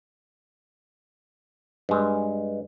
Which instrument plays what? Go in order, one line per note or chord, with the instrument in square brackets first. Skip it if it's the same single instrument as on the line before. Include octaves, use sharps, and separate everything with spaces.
[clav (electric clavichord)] G2 G#3